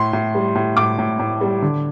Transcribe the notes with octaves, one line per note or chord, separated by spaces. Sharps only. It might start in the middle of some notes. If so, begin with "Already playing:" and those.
Already playing: A2 C6
A2
G3
A2
A2 D6
A2
A2
G3
D3